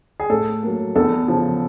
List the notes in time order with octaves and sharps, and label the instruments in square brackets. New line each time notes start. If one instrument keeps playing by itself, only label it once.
[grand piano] G#4
[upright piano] A2 [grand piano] A4
[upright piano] F#3 A#3
[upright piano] E2 [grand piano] A4
[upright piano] C#3 F3